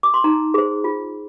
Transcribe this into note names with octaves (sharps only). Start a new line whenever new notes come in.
D6
C6
D#4 A#5
G#4 C5
F4